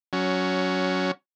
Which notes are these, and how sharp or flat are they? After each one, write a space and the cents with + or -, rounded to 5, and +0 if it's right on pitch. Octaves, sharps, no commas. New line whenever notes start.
F#3 +0 C#4 +15